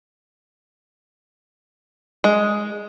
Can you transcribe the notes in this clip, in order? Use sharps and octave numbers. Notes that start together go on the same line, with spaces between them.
G#3